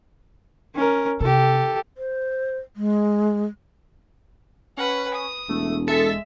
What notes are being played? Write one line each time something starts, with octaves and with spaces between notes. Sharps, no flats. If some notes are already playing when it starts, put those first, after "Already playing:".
C#4 A#4
C3 G4 A4
C5
G#3
C#4 B4 F#5
D#6
E1 A3
G#3 A4 E5